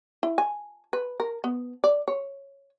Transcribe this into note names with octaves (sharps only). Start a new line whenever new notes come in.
E4
G#5
B4
A#4
B3
D5
C#5